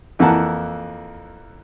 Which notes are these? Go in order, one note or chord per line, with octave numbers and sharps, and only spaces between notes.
F2 E3 A#3 F#5 A5